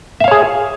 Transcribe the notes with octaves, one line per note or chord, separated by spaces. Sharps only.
G#4 C#5 E5 F5